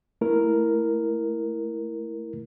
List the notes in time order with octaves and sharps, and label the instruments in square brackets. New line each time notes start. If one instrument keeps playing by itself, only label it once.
[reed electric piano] A3 E4 A#4